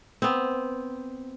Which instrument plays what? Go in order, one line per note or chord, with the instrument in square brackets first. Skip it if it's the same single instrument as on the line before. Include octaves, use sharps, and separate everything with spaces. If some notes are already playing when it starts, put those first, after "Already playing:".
[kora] B3 C4